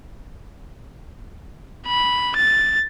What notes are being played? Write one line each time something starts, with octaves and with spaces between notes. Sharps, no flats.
B5
A6